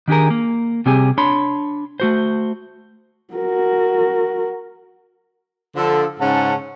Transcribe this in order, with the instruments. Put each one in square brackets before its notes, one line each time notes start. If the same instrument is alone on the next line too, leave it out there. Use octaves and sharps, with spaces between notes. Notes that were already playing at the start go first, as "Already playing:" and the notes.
[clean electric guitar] D#3 D4 G4 G#4 A#4
A#3
C3 G3 C4 G4 G#4 G#5
D4 C#5 B5 C6
A3 F#4 C5
[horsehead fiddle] F#4 A#4
[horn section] D3 F3 A4
G#2 C#3 C#4 F#5 A5